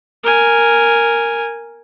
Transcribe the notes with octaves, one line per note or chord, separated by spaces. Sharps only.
A#4 G#5